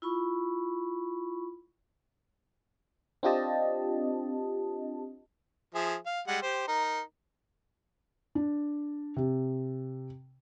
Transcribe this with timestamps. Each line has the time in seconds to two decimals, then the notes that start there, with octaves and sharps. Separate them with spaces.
0.02 E4 F4 B5 C#6
3.23 C4 D4 F4 G4 D#5 A5
5.75 F3 G#4 E5
6.06 F5
6.27 G3 G#3 F#5
6.42 G4 C5
6.68 D#4 A#4
8.35 D4
9.16 C3